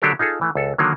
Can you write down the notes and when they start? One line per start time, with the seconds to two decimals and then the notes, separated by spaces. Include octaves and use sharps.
0.02 D3 F#3 D4 G4 A4 A#4
0.19 D#4 F4 G#4 A4
0.41 E3 A3
0.55 C#2 A4
0.78 D3 D#3 F#3 A#3